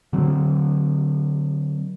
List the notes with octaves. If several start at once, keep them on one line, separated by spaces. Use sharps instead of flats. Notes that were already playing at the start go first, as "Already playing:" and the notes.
D3 F#3 C4